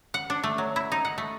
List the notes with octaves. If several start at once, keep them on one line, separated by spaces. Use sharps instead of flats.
F#5
D4
A3
F#3
E4
D#4
F#5
A3